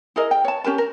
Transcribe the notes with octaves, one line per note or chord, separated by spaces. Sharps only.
E4 G#4 A#4 D#5
G5
C#5 A5
C#4 G4 A#4 A5
A#4